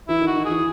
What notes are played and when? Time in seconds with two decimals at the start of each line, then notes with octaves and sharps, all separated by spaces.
0.08 E3 E4
0.21 D#3
0.27 F#4
0.36 D#3
0.45 G#4
0.50 E3